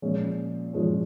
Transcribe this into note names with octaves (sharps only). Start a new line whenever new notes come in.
A#2 F3 G#3 C#4
A#2 F3 G#3 C#4